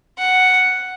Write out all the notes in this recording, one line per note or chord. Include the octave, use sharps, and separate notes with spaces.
F#5